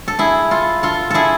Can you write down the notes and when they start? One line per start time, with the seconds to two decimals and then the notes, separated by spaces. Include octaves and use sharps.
0.08 A4
0.19 E4 G#4
0.51 F4 A4
0.83 F4 A4
1.10 E4 G#4 A4